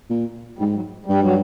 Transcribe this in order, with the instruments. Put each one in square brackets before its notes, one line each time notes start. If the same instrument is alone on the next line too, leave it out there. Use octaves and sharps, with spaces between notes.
[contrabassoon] A#2
[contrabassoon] G#2 [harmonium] G3
[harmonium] F#3
[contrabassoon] G2 [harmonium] G3
[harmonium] F#3